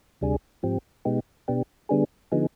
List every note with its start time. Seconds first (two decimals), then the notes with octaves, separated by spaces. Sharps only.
0.21 D2 C3 G3 D4 G#4
0.63 G#2 F3 C4 G4
1.05 B2 G#3 B3 D#4 G4
1.48 B2 B3 D4 G4
1.89 D3 G3 B3 D4 G#4
2.32 D3 F3 B3 D#4 G#4